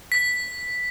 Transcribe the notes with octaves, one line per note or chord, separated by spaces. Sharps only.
B6